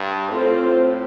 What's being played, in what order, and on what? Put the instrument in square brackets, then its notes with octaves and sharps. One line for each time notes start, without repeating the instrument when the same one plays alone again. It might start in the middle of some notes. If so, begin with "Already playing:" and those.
Already playing: [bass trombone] G2
[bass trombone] A2 [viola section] C4 F4 A4 C5